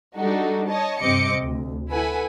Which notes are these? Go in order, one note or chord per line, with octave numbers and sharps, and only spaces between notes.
G3 D4 D#4 F#4 A4
C#5 D#5 A5
G2 C3 C4 D#5 D6 C#7
D2
E4 A4 B4 F#5 G#5 B5